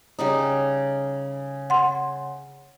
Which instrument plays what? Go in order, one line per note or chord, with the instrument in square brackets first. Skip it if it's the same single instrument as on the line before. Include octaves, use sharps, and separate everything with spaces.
[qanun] C#3 G3 D#4
[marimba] F#5 C6